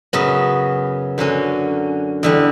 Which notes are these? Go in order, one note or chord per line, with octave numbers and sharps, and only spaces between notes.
F#2 C#3 F#3 B3
F#2 D3 F#3 C#4
E2 D3 G3